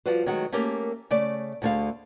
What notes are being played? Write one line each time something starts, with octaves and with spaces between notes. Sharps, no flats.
F3 G3 F#4 B4 C5
D#3 F#3 G#3 A3 F#4
A3 A#3 C#4 G4 A#4
C#3 A3 D5
D2 D3 A3 G#4 F5